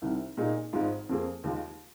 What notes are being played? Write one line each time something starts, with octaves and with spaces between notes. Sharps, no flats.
C2 C3 D#3
A#2 A#3 D#4 G#4
G#1 G#2 G#3 F4
F2 F3 A#3 G#4
D#2 D#3 G#3 F4